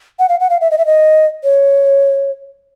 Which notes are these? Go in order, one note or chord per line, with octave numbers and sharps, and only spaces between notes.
F#5
F5
F#5
F5
E5
D#5
E5
D#5
C#5